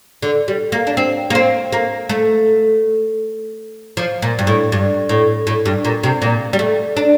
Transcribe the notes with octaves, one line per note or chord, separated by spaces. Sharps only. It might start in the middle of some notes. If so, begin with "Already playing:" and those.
D3
G3
A#3
D4
C4
A#3
C4
A#3
A3
F3
A#2
G2
A2
G2
A2
A2
G2
A#2
C3
A#2
G3
A3
D4